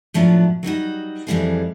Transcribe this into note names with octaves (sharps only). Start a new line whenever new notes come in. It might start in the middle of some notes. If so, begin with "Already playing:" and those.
A2 F3 F#3 B3 D4
F#3 G3 D#4 F#4
F2 E3 G3 C4 G#4 F5